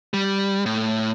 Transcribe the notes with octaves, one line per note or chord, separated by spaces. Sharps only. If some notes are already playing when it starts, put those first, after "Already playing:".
G3
A2